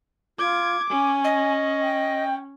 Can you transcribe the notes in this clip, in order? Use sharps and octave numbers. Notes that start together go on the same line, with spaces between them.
F4 D6 G#6
C#4 G#5
D#5
G5